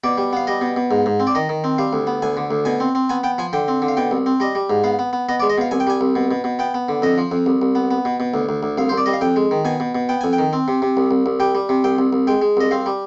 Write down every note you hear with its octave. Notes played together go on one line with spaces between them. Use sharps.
B2 D5
G3
B3 F5
G3 D#5
B2
B2
G#2
G#2
C4
D5
D#3 D#5
D#3
C4
G3 F5
D2
B3
D2 G#5
D3
D2
B2 G#5
C4
C4
B3 G#5
B3 G5
F3 G#5
D3 G5
C4
D3
F5
B2 G5
C2
C4
G3 D#5
G3
G#2
B3 F5
B3
B3
B3 D#5
G#3 D5
D#5
B2 F5
C2 G#5
G5
G3 G#5
C2
B2
B2
B2
B3 G5
B3
D3
F2 D#5
F3
F2
C2
C2
B3
B3
B2
B2
D2
D2
D2
C2 F5
C5
C2
D5
G3 D#5
F5
F2 G5
G#3
D#3
B2 G#5
B2
B2
B3 G5
F2 G#5
G5
D#3
C4
C3
C3
C2
C2
C2
G3 G5
G3
C3
C2 G5
C2
C2
G#3 G5
G#3
C2 D#5
C4 F5
G3